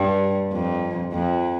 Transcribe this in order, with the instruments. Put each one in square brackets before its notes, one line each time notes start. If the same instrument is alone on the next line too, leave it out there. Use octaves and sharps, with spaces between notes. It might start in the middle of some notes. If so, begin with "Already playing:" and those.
Already playing: [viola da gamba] G2
F2
F2